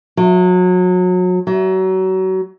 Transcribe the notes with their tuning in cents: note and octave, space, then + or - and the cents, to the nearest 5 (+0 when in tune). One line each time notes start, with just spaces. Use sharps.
F#3 -30
F#3 +30